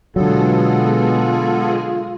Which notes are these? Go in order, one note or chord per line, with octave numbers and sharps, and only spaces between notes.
B2 D3 F#3 G#3 B3 F4 G#4 A4